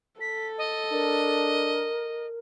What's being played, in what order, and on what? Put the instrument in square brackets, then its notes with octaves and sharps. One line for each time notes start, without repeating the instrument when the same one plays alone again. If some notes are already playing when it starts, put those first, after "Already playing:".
[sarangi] A4 [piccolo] B6
[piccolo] D#5
[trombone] D4 [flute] A#4